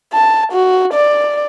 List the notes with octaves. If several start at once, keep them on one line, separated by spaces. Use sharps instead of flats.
A5
F#4
D5